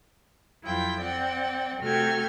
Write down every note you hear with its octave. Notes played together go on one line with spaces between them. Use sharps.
F2 F3 F#3 E4 G5
C4 D5 F#5 G5
C3 A3 F#4 G5 F6 G#6